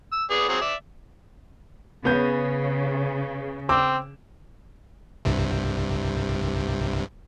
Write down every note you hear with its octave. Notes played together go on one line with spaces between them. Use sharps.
E6
B3 G#4 D5
F#3 C4 G#4
D5 E5
C#3 B3 G6
C4 D6 E6
C2 G2 C3